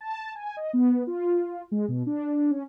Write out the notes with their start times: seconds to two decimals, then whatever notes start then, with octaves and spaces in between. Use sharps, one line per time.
0.01 A5
0.35 G#5
0.57 D#5
0.73 B3
1.07 F4
1.71 G#3
1.88 B2
2.06 D4
2.50 C#4